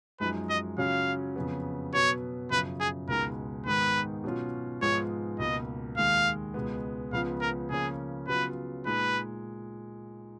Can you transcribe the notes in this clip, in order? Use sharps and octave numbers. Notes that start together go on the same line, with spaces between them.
F#2 F3 G#3 D#4 B4
D#5
C#3 F#3 C#4 F4 F5
F2 C#3 F#3 B3
B2 F#3 B3 C#5
F#2 C#3 F3 B4
G#4
C#2 B2 G#3 D#4 A#4
G#2 D#3 G#3 B3 D#4 B4
B2 F#3 C#4 F4
G#2 F3 G#3 B3 F4 C#5
C#2 B2 A#3 D#5
D#2 D#3 G#3 F5
C#2 B2 G#3 B3
C#2 C#3 F3 B3 F5
A#4
C#3 F3 A#3 C#4 G#4
C#3 F#3 B3 F4 B4
A#2 G#3 D#4 B4